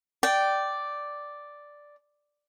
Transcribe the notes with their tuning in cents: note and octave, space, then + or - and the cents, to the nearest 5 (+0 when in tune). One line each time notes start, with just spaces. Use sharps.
D5 +0 G5 -15